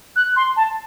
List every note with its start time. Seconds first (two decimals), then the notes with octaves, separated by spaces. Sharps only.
0.16 F#6
0.36 C6
0.56 A5